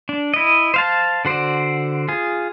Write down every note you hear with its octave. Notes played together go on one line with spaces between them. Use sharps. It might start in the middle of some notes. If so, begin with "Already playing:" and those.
D4
E4 D#5
C5 F5 A5
D3 F#4 C5 D5
F4 G#4